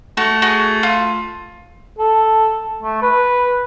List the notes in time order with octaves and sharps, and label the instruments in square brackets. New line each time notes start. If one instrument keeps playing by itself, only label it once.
[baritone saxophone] A3 [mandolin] F#4
[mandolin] F#4 G#4
F4
[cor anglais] A4
A3
B4